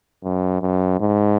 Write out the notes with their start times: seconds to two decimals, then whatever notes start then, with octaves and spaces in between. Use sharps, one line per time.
0.24 F#2
0.62 F#2
1.00 G#2